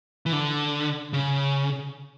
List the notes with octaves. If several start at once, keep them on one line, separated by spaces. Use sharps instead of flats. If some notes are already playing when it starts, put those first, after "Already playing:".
E3
D3
C#3